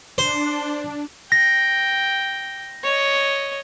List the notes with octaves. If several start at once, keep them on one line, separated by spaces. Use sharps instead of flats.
D4 C5
G5 A#6
C#5 D#5